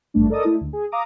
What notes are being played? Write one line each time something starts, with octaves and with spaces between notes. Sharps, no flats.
G#1 G2 A3 D4
A4 A#4 D5 D#5 A5 D#6
A3 E4
D2
G#4
F5 A#5 D6 D#6